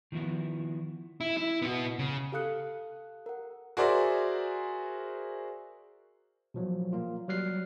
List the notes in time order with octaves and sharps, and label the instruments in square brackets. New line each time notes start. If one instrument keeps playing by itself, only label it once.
[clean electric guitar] D#3 F3 B3 E4 F#4
[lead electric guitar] E4
E4
B3 F#4
C#3
[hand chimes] G4 A4 F5 D#6 F#6 C#7
A#4 F#5
[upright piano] F#4 G#4 A#4 C5 D5 E5
[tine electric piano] B2 F3 F#3
A#3 F4
F#3 G3 F6 F#6 C7